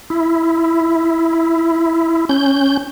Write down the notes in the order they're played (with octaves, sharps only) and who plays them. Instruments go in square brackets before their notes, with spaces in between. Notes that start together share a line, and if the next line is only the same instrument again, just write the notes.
[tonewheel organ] E4
C#4 G6